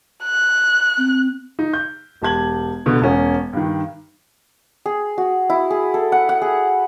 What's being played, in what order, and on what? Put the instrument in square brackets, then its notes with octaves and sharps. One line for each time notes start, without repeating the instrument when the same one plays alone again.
[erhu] F#6
[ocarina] C4
[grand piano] D#4
G6
E1 G4 A5 G#6 F#7
B2 D3
E1 C#4
G2 D#3
[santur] G#4
F#4
E4
G#4
A4
F#5
F#5
G#4